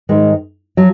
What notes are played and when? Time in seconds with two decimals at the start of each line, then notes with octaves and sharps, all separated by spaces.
0.09 G#2 D#3 G#3
0.77 F3 F#3